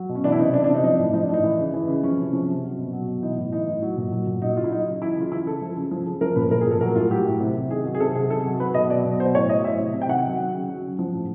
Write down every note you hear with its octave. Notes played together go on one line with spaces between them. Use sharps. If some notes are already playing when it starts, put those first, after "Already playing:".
Already playing: F#3
B2
C#4
E3 D4
E4
C3 D#4
E3 D4
D4
C3 D#4
F3 D#4
A2
F3 D#4
D4
A2 D#4
E3
C#3
E3
C#3
F3 C#4
C3
F3
C3
F#3
B2
F#3
B2
E3 D#4
A2
E3 D#4
A2
F#3
A#2
F#3
A#2
F#3 D#4
C#3 F4
E4
F#3 D#4
C#3
E3 E4
C#3 F4
E3 E4
C#3 A4
F3
C#3
F3
C#3
F3 A#4
A#2 B4
F3 A#4
G#4
A#2 A4
F#3 A#4
A2 F4
F#3 G4
A2
C3
C3
D#3 G#4
F#3
G#4
C3 A4
C3 G#4
D#3 A4
F#3
F#3 B4
B2 D#5
F#3 D5
B2
F#3 C5
A2 C#5
F#3 D#5
A2 E5
C3
C3
G5
D#3 F#5
F#3
F#3
C#3
F#3
C#3
F3
A2